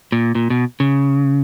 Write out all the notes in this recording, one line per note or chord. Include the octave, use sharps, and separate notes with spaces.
A#2
A#2
B2
C#3